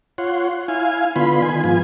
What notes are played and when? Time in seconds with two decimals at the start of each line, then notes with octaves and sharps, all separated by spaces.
0.18 F4 C#5 F#5 C6
0.68 E4 F5 G#5
1.16 D3 B3 F4 B5 C6
1.42 D#3 G#5
1.64 G#2 F3 B3 F4 G#5